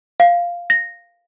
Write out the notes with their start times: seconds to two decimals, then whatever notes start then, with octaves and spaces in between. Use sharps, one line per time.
0.20 F5
0.70 A#6